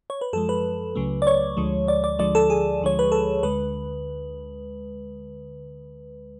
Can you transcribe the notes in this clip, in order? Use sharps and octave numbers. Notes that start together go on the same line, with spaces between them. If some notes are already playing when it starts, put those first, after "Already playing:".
C#5
B4
F#2 F3 G#3 A4
B4
C#2 C#3 F#3 A3
D5
C#5
D2 D3 F3 G#3
D5
D5
D2 D3 F3 G#3 D5
A4
G#4
D2 D3 F3 G#3 C#5
B4
A4
D2 D3 G#3 B4